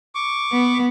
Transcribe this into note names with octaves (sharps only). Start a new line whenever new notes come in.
C#6 D6
B3